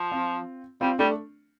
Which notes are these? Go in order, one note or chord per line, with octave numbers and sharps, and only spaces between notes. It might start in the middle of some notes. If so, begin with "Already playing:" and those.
Already playing: F3
C4 F4
G3 C4 F4
G3 A3 D4